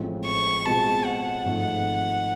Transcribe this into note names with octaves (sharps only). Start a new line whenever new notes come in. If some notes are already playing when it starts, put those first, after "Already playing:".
Already playing: A1 A2 F3 G#3 C4
C#6
B2 G#3 C4 F4 G#4 A5
F#5
G#1 G#2 F3 A3